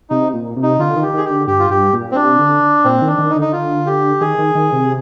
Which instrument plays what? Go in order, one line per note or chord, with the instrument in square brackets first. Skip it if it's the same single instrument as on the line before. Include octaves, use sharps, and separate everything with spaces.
[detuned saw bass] C3 [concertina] D#4
[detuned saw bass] A#2
C3
[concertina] D#4
[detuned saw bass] D3 [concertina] F4
[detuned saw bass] D#3
[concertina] G4
[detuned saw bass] D#3 [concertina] G#4
[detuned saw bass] D3 [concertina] G4
[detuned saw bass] G2 [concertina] G4
[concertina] F4
[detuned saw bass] G2 [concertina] G4
[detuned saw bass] A#2
[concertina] C4
[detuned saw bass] C3 [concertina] D4
[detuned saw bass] D3
[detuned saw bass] A#2 [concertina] C4
[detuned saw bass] D#3
[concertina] D4
[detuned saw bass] D#3
[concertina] D#4
[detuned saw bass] D3
[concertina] D#4
F4
G4
[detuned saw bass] D#3 [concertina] G#4
[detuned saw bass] D#3
D#3
C3